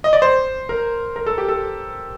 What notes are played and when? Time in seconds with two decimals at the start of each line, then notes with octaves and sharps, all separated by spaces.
0.04 D#5
0.13 D5
0.22 C5
0.69 A#4
1.16 A#4
1.27 A4
1.38 G4
1.48 A4